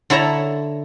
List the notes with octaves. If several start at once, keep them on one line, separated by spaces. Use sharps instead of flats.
D3 E4 C#5 A5 A#5